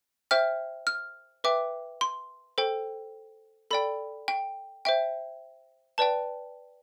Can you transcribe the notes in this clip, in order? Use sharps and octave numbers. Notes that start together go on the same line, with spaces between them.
C5 E5 G5 F6
F6
B4 E5 G5 D6
C6
A4 C5 G5
A4 D5 G5 B5
G5
C5 E5 G5
B4 D5 G5 A5